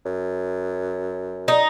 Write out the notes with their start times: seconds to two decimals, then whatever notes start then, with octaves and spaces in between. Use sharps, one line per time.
0.05 F#2
1.48 D#4